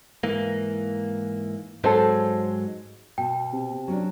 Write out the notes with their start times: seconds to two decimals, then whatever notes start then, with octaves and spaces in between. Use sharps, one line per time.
0.24 G#2 E3 A#3
1.84 G#2 F#3 G#3 A4 C5
3.18 B2 G5 A5
3.53 C3
3.88 F#3 C#4 D4